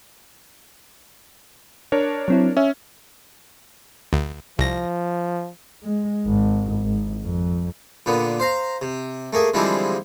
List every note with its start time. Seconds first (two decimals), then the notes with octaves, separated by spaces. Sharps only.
1.92 D4 A#4 C#5
2.28 F#3 C4 E4
2.57 C#4 E5
4.13 D2
4.59 C2 F3 A#6
5.83 G#3
6.26 G#1
6.84 G#1
7.23 F2
8.06 A#2 D3 B3
8.40 C5 F5 A#5
8.82 C3
9.33 A3 A#3 G#4
9.54 D3 E3 F3 G3 G#3 C4